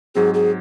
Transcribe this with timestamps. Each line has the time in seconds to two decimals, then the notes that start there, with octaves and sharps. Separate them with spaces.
0.15 G#2 F#3 C4 G#4
0.34 G#4